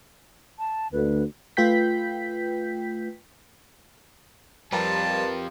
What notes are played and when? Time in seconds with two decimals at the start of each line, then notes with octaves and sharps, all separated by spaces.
0.59 A5
0.93 D2 B4
1.57 A3 F4 B4 G5 G6 B6
4.73 F2 F3 G3 F4 G4 A#4 B4 A5